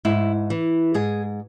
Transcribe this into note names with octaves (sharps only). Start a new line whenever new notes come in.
G#2 E4
E3
G#2 G#4